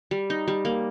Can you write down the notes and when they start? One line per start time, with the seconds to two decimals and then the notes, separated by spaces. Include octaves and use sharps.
0.11 G3
0.30 D#4
0.48 G3
0.65 A#3